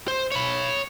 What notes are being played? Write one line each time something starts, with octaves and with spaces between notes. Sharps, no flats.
C5
C#5 B5